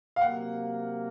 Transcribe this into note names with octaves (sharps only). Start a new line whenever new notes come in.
F5
C3 F#3 A#3 F#5